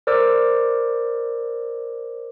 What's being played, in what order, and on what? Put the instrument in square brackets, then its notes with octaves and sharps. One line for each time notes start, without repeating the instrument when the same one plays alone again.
[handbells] A#4 C5 D5 D6 E6